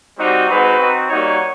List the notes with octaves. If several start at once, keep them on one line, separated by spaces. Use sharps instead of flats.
G3 C4 D#4 F#4
G#3 C4 D#4 F#4 B4
C4 D#4 F#4
G3 A#3 D#4 F#4 C#5